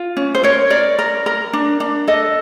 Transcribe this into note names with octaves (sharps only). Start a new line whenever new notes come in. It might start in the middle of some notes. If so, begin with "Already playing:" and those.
Already playing: F4
C#4
C5
A#4 C#5
A#4 D5
A#4
A#4
D4
D4
A4 D#5